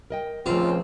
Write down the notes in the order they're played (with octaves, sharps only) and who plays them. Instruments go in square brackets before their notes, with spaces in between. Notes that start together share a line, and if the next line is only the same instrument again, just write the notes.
[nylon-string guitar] A#4 D#5 G5
[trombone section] C#2 [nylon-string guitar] F3 A3 [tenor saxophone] C4 [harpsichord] F4